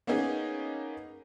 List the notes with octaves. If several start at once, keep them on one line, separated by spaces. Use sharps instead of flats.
A#3 B3 C#4 D#4 G#4